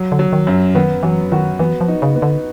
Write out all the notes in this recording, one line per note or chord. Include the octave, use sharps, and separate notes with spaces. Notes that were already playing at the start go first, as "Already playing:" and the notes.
Already playing: F#3
D3
F#3
D#3
F#2
D#3 B3
E3 F#3
D#3 F#4
E3 B3
F3
D#4
C#3
B3
D3